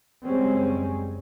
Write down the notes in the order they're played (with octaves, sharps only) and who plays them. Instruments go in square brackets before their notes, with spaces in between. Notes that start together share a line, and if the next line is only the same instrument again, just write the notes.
[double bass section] F#1 G3 G#3 C4 C#4